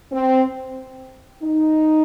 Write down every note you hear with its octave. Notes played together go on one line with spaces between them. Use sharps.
C4
D#4